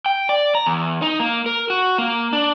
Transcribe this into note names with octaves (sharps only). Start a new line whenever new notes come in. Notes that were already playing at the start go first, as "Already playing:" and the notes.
G5
D5
A#5
E2
D#4
A#3
A#4
F#4
A#3
D4